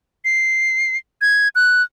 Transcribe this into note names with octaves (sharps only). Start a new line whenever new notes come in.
C7
G#6
F#6